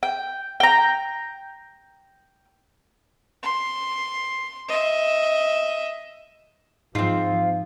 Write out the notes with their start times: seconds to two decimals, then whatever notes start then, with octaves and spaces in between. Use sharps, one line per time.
0.03 G5
0.60 G5 A#5
3.43 C6
4.68 D#5 E5
6.95 G#2 F3 C4 F4